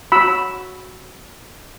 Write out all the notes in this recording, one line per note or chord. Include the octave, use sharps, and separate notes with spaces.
F#4 C#5 B5 E6